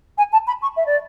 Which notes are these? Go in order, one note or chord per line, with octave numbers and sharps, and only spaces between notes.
G#5
A5
B5
C#6
E5
D5